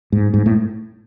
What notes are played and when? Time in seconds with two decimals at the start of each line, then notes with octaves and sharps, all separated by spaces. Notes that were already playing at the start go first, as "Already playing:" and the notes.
0.12 G#2
0.34 G#2
0.46 A2